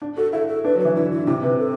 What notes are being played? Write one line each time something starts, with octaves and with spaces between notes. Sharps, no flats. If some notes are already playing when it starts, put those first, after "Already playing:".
D4
F#4 A4
E4 A4
A4
D4 B4
F#3
E3 B4
D3 E4
E4
D3
C3 E4
C3 B4
A4